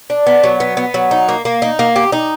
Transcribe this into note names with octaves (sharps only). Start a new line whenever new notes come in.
D4
B3
F#3
B3
B3
F#3
D#4
A#3
A#3
D#4
A#3
G4
D#4